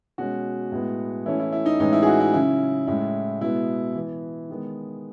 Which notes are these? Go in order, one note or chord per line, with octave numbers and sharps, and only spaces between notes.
B2 G#3 C#4 F#4
A2 G#3 B3
E3 A3 C#4 E4
E4
E4
D#4
A2 E3 G#3 C#4 D#4
E4
G#4
F#4
E4
C#3 F#3 C#4 E4
A2 G#3 C#4 E4
B2 G#3 B3 E4
E3 B3
D#3 G#3 B3